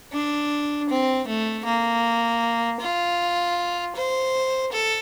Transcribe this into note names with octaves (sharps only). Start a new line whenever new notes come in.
D4
C4
A3
A#3
F4
C5
A4